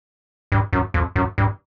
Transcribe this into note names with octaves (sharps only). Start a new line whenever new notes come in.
G2
F#2
F2
F#2
G2